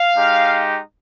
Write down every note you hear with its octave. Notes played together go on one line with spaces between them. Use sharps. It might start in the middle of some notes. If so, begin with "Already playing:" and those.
Already playing: F5
G#3 D#4 G4